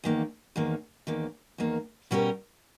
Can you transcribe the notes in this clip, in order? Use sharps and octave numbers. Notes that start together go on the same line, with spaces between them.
E2 D#3 A#3
E2 D#3 A#3
E2 D#3 A#3
E2 D#3 A#3
B2 G3 C#4 G4 A#4